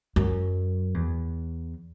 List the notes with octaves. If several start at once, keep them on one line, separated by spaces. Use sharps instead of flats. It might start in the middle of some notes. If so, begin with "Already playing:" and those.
F#2
E2